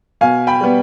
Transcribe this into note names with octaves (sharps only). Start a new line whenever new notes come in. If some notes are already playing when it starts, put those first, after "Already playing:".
B2 F5 G#5
G5 B5
G3 B3